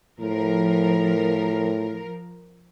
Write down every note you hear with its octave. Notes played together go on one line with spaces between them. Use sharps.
A2 F3 A#4